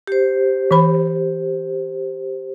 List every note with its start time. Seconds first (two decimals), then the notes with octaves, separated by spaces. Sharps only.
0.07 G4 C5
0.71 E3 B5